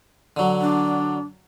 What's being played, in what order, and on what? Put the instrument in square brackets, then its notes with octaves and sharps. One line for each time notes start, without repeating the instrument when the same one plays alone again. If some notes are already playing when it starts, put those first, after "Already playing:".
[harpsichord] D3 F#3
[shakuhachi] D4